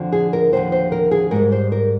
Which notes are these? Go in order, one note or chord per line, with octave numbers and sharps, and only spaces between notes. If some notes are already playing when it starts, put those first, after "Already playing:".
Already playing: F2 D3 F3
G#4
A#4
D#2 D3 F3 C5
C5
A#4
G#4
G#2 G3 A#4
C5
A#4